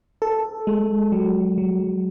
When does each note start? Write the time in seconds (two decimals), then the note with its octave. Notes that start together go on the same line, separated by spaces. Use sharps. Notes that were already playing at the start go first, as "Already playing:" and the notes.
0.22 A4
0.67 G#3
1.12 F#3
1.58 F#3